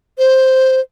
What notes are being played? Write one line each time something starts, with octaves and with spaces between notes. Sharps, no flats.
C5